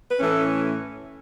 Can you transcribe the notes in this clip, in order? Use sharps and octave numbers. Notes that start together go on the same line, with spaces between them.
B4
A2 E3 A3 C#4 A4